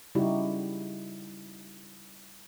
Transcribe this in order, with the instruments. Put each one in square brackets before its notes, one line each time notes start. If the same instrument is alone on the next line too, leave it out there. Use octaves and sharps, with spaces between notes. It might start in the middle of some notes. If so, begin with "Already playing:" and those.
[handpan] C#3 G3 D#4 E4 F#4 G4